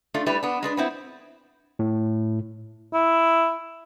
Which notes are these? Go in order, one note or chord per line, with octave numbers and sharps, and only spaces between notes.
A3 D4 F4
G3 A3 D4 E4 G4 B4
B3 D4
G#3 D4 B4
B3 C4 E4
A2
E4